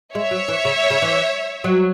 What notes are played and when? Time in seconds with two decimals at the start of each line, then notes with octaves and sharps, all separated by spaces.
0.15 G#3 C#5 E5
0.31 F#3
0.48 E3
0.65 C#3
0.90 C#3
1.02 E3
1.64 F#3